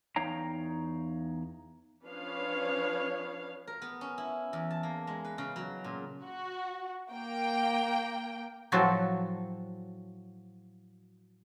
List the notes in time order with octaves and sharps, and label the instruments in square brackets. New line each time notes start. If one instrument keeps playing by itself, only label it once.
[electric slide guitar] E2 D#4 C#5 F5 G5 A#5
[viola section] F3 C#4 D4 B4 C#5 F5
[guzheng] A#4
B3
C#4
E4
E2
A5
A#3
G#3
B4
C#3
F#3
A#2
[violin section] F#4
A#3 G5
[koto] A2 F3 F#3 C4 F#4 A4